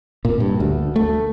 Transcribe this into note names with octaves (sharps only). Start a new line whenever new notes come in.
A#2
G2
D2
A3